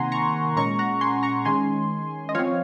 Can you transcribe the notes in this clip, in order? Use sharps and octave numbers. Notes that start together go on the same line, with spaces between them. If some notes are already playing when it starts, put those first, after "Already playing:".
Already playing: C3 D#3 A#3 F#5 G#5 A#5 C6
A#5 C#6
A#2 G#3 C#4 A#5 C#6
F#5 A#5
G#5 C6
A#5 C#6
D#3 G#3 C#4 G#5 C6
D#5
F3 C4 C#5 F5